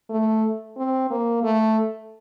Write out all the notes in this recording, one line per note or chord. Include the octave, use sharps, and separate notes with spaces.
A3
C4
A#3
A3